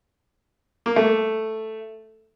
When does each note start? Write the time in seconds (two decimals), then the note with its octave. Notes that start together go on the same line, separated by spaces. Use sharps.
0.86 A#3
0.96 A3